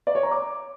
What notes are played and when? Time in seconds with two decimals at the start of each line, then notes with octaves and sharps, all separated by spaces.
0.07 D5
0.15 C#5
0.23 A#5
0.31 D6